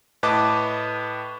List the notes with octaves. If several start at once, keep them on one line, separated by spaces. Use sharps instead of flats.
A2 B4 D#5 A5 D6